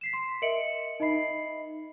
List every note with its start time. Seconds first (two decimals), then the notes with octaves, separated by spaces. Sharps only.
0.01 B6 C7 E7
0.13 C6
0.42 A#4 D#5 E5 C#7 D7 F#7
1.00 D#4 D#5 E5 B5 C7